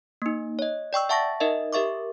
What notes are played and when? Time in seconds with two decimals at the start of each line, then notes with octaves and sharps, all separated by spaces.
0.22 A#3 D#4
0.59 C#5 D#5
0.93 D5 G5 C#6 E6
1.09 E5 F#5 A5 C#6 A6 A#6
1.40 D#4 A#4 D#5 E5
1.73 G4 A#4 E5 C#6 D6